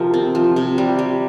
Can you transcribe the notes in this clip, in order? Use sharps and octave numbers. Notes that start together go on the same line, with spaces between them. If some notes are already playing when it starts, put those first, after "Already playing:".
Already playing: C3 F3 A#4
C4
F3
C3
G3
G3